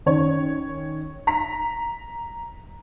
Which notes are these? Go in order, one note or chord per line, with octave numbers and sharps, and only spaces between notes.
D#3 C#4 C#5
A#5 B6